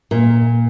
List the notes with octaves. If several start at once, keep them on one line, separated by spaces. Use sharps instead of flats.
A#2